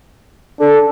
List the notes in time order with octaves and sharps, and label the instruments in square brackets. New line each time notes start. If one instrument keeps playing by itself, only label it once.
[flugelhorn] D4 [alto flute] A4